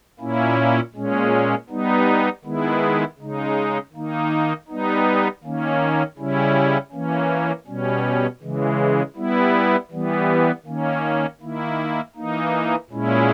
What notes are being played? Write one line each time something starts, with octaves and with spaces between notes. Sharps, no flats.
A#2 A#3 C#4 E4
A#2 G#3 C#4
G3 B3 D#4
D#3 G#3 B3 E4
C#3 G#3 D#4
D#3 A#3 D#4
G3 B3 D#4
D#3 A#3 C#4
C#3 G3 C#4 E4
E3 A#3 C#4
B2 G3 C#4
C#3 E3 G#3
G3 B3 E4
E3 G3 B3
D#3 A#3 C#4
D#3 A#3 E4
E3 A#3 D#4
A#2 G#3 C#4 E4